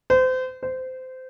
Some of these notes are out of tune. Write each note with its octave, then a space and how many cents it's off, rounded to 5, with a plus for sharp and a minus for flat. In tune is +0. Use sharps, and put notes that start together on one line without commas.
C5 -30
C5 -20